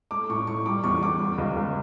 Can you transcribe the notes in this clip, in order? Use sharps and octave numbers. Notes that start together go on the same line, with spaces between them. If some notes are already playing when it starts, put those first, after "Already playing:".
A3 D6
A2 C#6
A2 C#6
G3 D6
E2 C#6
E2 D6
G3
C#2
C#2